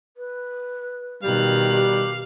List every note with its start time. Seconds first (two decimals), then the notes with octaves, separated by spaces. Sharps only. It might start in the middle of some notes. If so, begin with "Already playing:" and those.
0.17 B4
1.23 B2 D#3 G3 F5 F#6
1.73 G4